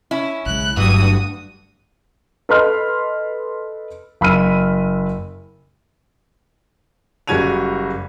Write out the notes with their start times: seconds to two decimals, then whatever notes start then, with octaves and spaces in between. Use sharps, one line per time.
0.11 C#4 E4
0.46 B1 C#3 G#3 F#6
0.77 G1 G2 E3 F#3 A3 F#4 D#6
2.49 A4 B4 D#5 B5 C6 F6
4.21 F#1 B5 E6 F6 D#7
7.28 F#1 G3 F#4 G#6 D#7 F7